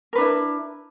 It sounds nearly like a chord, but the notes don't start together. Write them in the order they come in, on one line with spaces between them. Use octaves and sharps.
A#4 B4 D4 E4